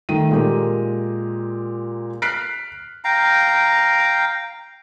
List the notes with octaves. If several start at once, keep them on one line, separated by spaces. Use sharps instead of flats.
D#3 A3 D#7
A#2 G#3 G4 A#4
F6 F#6 B6 C7 D7
F5 G5 A#5